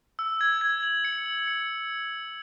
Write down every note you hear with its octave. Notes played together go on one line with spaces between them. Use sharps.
E6
G#6
G#6
F#7
C#7
F#7
C#7